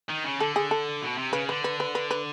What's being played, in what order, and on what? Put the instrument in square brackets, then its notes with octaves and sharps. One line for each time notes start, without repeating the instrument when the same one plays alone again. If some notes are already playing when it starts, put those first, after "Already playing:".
[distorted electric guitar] D#3
C#3
[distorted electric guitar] D3 [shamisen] A4
[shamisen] G#4
A4
[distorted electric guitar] B2
C3
[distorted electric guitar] C#3 [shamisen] B4
[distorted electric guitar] D3 [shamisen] B4
[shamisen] B4
B4
B4
B4